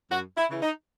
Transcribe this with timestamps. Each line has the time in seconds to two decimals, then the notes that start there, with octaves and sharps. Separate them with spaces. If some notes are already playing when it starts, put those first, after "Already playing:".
0.10 F#2 F#4
0.36 E4
0.49 C#3 E3
0.62 D#4